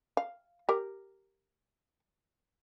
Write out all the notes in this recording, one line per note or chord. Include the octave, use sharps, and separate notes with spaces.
F5
G4 A#4